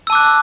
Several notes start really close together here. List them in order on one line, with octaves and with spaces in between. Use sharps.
E6 A5 D6 F#6